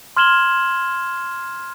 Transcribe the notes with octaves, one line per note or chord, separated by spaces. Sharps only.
C6 F6 G#6 E7 F#7 G7